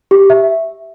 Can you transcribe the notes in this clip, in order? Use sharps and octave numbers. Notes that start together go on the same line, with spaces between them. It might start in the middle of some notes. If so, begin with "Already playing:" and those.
G4
E5